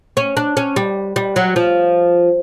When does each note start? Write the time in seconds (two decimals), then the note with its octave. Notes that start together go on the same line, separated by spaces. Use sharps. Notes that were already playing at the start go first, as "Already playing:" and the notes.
0.17 C#4
0.37 D4
0.57 C#4
0.76 G3
1.16 G3
1.36 F#3
1.56 F3